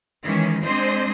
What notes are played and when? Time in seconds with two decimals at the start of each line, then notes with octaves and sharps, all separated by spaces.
0.23 D#3 E3 G#3 C#4
0.63 G#3 C4 D4 C5 D#5